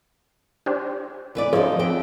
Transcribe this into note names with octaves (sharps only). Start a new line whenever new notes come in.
D4 G4 C5
E3 B4 D5
F3 C#4 D#4 E4 G#4
F2 G5